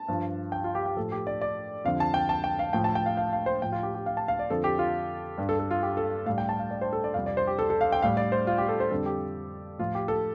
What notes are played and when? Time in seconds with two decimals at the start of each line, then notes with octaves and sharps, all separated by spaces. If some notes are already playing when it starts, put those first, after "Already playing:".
Already playing: A5
0.08 G2 F3
0.52 G5
0.64 F4
0.75 G4
0.86 G4
0.96 A2 F3 A4
1.12 G4
1.27 D5
1.41 D5
1.84 F2 D3 F3 F5
2.00 A5
2.14 G5
2.29 A5
2.44 G5
2.59 F5
2.73 A2 F3 G5
2.84 A5
2.95 G5
3.06 F5
3.17 F5
3.33 F5
3.46 C5
3.62 A2 F3 G5
3.72 F4
3.83 G4
3.95 G4
4.06 F5
4.17 A5
4.28 F5
4.39 D5
4.50 F2 D3 F3 A4
4.64 G4
4.79 F4
5.38 G2 G3
5.49 A4
5.60 A4
5.71 F4
5.83 G4
5.97 A4
6.26 A2 F5
6.30 G3
6.38 G5
6.49 A5
6.59 F5
6.71 D5
6.81 C5
6.93 A4
7.04 D5
7.14 F2 C3 G3 F5
7.26 D5
7.37 C5
7.47 G4
7.59 A4
7.70 A4
7.81 F5
7.92 G5
8.02 A2 G3 F5
8.17 D5
8.32 C5
8.47 F4
8.58 G4
8.68 A4
8.80 C5
8.91 F2 D3 G3 A4
9.06 G4
9.79 A2 F3 F4
9.95 G4
10.08 A4